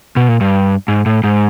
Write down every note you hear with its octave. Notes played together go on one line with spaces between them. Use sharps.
B2
A#2
G2
G#2
A2
G#2